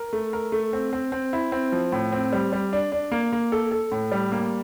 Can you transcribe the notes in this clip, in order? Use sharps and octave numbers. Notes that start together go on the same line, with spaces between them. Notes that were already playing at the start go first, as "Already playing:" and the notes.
Already playing: A#4
A3
A#4
A3
C4
C4
C4
E4
C4
F3
A2
C4
G3
G3
D4
D4
A#3
A#3
A4
A4
A2
G3
A#3